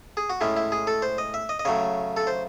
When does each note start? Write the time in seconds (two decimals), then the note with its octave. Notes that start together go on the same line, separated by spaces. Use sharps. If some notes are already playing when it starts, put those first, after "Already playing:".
0.17 G#4
0.30 F#4
0.41 A2 G#3 C#4 E4
0.57 E4
0.72 G#4
0.87 A4
1.02 C5
1.18 D#5
1.34 E5
1.49 D#5
1.59 D#5
1.65 C#3 F#3 A3 C#5
2.17 A4
2.27 C5